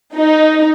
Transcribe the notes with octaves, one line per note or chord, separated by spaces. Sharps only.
D#4